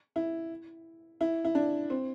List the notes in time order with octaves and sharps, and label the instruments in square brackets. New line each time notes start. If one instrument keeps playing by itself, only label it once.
[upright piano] E4
E4
E4
D4
C4